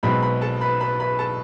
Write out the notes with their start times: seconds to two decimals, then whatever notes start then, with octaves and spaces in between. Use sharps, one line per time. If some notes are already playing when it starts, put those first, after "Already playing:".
0.03 B1 B2 G#3 C4 B4 B5
0.22 B4 B5
0.41 A4 A5
0.61 B4 B5
0.80 B4 B5
1.00 B4 B5
1.19 A4 A5